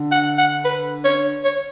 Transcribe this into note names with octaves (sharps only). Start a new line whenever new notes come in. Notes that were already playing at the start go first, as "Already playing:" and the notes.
Already playing: D3
F#5
F#5
B4
C#5
C#5